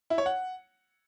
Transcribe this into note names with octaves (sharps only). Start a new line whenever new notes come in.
E4
C#5
F#5